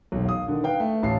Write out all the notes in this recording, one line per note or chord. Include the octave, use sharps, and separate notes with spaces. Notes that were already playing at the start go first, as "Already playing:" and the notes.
E1 B1
F5 D#6
D3 D#3
B4 F5 G5
A3
A1 F5 A5 C7